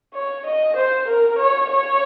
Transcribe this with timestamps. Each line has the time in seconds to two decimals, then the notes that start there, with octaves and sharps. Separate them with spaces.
0.14 C#5
0.46 D#5
0.76 C5
1.07 A#4
1.38 C#5
1.70 C#5